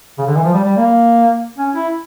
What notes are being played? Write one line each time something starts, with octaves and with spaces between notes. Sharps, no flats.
C#3
D3
E3
F3
G3
G3
A#3
C#4
E4